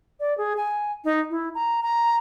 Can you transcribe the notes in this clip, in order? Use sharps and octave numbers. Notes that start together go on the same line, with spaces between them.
D5
G#4
G#5
D#4
E4
A#5
A#5